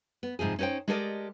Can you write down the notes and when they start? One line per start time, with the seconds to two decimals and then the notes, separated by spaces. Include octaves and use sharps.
0.23 B3
0.39 G#2 C3 F3 G#4
0.59 C#4 D#4 B4 C5 G5
0.88 G#3 G4 A4 A#4 D5 D#5